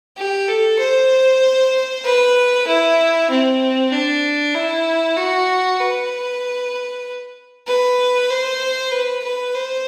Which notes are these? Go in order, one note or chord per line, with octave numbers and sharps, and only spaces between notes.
G4
A4
C5
B4
E4
C4
D4
E4
F#4
B4
B4
C5
B4
B4
C5